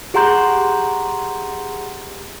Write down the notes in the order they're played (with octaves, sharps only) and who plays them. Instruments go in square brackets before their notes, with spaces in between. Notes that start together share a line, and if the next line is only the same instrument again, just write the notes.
[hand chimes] G4 G#4 F#5 A#5 C6 G6